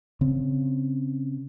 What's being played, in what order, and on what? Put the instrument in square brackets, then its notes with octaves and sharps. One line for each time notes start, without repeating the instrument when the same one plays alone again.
[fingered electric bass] C#3 C4